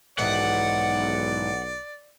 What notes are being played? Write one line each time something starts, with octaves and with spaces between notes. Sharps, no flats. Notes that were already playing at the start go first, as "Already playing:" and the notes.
B1 G#2 D#3 E3 D5 F#5